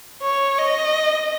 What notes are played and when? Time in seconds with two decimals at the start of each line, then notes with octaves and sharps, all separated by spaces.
0.22 C#5
0.58 D#5